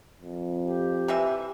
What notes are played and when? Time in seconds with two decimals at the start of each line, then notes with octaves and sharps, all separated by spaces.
0.21 F2
0.62 G4
1.08 C3 E3 E5